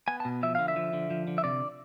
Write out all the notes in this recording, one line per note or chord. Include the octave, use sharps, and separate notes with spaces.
B3 G#5
A5
B2
F3 E5
D3 F5
E5
F3
D3
F3
D3
E5
C3 D5